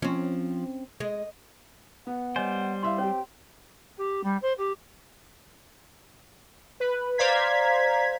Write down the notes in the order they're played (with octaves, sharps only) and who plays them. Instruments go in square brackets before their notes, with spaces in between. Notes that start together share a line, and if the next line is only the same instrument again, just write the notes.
[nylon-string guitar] F3 [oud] C4 C#4
[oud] G#3 [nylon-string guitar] D#5
[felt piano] B3 [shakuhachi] F#5
[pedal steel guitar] G3 C5 [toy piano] C#5 D#5 G#5
[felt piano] E4 E5 F5 [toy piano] C6
[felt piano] C4 G4 [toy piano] C#5 [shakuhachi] G5
[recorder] G4
G3
C5
G4
[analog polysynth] B4
C5 D5 F5 A#5 G#6 B6